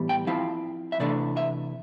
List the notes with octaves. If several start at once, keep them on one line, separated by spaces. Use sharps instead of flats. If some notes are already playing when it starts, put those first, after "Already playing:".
Already playing: A2 E3 G3 B3
G5
F3 C4 E4 F5
E5
C3 E3 A3 D4 D5
E5